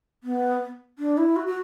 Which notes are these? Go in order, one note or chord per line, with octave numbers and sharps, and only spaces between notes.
B3
D4
E4
F#4
F#4